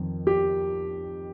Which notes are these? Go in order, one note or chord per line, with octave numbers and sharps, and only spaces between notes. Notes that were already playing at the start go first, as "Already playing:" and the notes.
Already playing: F2 D#3
G4